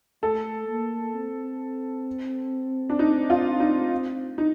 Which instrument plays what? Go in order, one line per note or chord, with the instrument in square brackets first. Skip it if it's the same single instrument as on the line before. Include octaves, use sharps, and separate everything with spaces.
[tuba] A3 [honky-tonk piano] A4
[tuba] A#3
C4
[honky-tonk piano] D4
D#4
F4
D#4
D#4